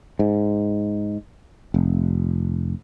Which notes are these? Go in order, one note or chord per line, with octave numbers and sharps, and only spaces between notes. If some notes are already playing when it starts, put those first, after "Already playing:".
G#2
F1